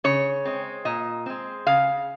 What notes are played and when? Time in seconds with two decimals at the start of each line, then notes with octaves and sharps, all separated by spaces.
0.04 C#3 C#5
0.45 G#3 C4
0.85 A#2 D#5
1.26 G#3 C4
1.67 C#3 F5